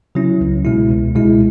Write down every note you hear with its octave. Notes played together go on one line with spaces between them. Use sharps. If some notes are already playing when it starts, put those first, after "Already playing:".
C#3 F#3 C#4 E4
C#2
B2 G#3 E4
C#2
B2 G#3 E4